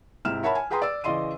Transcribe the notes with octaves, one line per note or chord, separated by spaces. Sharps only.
G#2 C3 E4 F6 E7
A#4 C#5 E5 F#5 A5 B5
G#5
G#4 B4 G5 A#5 C6 D#6
D5 E6
C#3 E3 D5 D#5 C6 D#7